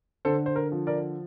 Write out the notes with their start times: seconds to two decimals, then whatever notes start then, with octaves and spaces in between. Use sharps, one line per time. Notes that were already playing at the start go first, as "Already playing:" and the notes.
0.25 D3 A4 C5
0.46 C5
0.56 A#4
0.72 F3
0.87 A#4 D5